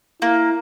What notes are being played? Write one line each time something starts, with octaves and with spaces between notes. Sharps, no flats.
A#3 E4